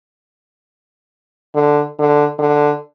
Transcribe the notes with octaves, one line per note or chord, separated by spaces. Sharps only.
D3
D3
D3